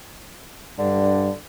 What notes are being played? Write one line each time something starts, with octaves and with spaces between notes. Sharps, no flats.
G2 D3